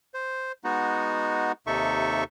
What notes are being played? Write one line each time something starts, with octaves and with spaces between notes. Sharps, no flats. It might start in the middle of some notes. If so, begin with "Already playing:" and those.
C5
G#3 B3 D#4 F#4
D#2 C3 D#4 A4 E5 C#6